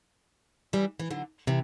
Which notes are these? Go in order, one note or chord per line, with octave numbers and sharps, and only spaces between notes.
E3 G3
E3
D3 F#3
C3 E3